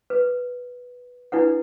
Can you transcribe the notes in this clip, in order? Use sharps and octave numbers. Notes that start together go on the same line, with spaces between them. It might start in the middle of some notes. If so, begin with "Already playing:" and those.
B4
D4 E4 B4 F#5